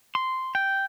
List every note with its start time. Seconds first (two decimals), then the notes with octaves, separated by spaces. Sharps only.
0.15 C6
0.55 G5